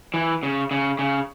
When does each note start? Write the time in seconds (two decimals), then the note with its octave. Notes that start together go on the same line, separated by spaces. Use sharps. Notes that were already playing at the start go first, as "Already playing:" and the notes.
0.14 E3
0.43 C#3
0.71 C#3
0.99 C#3